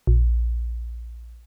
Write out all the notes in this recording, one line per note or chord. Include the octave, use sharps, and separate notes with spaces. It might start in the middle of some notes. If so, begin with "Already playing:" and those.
A#1